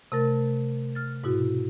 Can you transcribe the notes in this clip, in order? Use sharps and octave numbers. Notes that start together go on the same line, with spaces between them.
C3 A3 A#4 A6
F6 A6
G#2 B2 E4 F#4